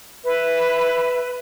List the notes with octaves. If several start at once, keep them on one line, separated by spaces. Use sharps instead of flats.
B4 E5